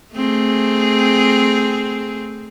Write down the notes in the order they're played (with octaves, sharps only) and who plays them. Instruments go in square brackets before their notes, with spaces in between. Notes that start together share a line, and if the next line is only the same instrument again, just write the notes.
[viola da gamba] A3 C4 G#4